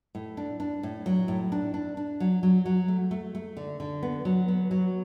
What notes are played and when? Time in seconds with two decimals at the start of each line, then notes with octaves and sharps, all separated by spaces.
0.15 A2
0.37 D4
0.60 D4
0.83 A2
1.06 F#3
1.28 A2
1.52 D4
1.74 D4
1.97 D4
2.20 F#3
2.43 F#3
2.65 F#3
2.88 A3
3.11 A3
3.35 A3
3.57 D3
3.80 D3
4.03 B3
4.25 F#3
4.48 B3
4.71 F#3